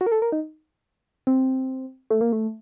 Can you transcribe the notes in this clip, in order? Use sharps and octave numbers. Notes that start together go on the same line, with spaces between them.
F#4
A#4
A4
A#4
D#4
C4
A3
A#3
A3